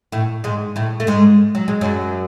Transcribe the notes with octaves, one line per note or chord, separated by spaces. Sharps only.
A2 A3
G#2 G#3
A2 A3
A3
G#2 G#3
F#3
G#3
F#2 F#3